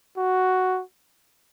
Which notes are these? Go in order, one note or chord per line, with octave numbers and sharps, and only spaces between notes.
F#4